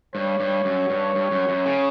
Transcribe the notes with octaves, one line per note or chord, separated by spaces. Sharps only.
G2 C#5
G2
F#2
G2
G2
F#2
F#2
C#3